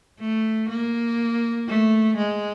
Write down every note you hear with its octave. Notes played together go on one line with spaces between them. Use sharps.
A3
A#3
A3
G#3